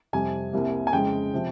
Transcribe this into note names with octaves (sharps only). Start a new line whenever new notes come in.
F2 C3 G3 G#5
C2 C3 G3 A#3
G#5
F2 C#3 G#3 G5
C3 F3